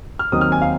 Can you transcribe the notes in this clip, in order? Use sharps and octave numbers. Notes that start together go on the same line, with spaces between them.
F6
D#2 D#3 F#3 C4 D#4 D#6
F6
G#5
F5